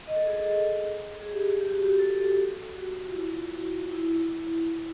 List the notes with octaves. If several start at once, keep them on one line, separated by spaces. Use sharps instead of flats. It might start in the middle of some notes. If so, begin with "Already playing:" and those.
D#5
A4
G#4
A4
G#4
G4
G#4
G4
F#4
G4
A4
F#4
F4
E4
F#4
E4